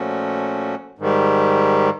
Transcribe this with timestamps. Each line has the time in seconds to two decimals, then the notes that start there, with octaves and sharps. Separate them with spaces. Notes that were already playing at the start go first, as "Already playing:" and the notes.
Already playing: A#2 F3 A3 C#4 F#4
0.99 G#2 D#3 G3